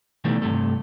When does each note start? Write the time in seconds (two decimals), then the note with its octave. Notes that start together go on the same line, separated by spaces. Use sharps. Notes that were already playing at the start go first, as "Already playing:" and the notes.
0.24 B2 D#3 E3 G3 A3
0.42 G2 C3 A3